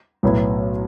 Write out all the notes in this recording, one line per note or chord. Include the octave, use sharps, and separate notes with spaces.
B1 A2 F#3 B3 E4